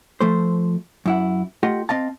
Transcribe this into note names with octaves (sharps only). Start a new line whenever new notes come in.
F3 A3 C5
F#2 E4 F#5
A3 F4 G4 D#5 F#5
C4 D#5 F5 A5